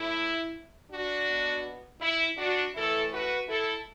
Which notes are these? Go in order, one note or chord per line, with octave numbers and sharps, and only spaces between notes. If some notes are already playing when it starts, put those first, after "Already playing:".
Already playing: A2 A3 E4
D4 F#4
B2 B3
E4
D4 F#4
A2 E3 A3 E4 A4
F#4 B4
E4 A4